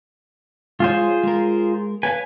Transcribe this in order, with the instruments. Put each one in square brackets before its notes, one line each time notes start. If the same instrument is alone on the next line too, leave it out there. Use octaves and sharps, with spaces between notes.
[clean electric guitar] G#3 C#5 [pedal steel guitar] F4 G#4 C5
[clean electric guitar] G#3 A#4
[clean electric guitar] B4 C#5 F5 [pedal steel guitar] G#5